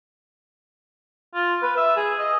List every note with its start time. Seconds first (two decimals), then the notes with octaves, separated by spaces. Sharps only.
1.35 F4
1.63 B4
1.77 E5
1.97 G#4
2.19 D#5